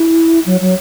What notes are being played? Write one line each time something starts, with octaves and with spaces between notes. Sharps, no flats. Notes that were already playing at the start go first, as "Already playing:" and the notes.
Already playing: E4
F#3
F#3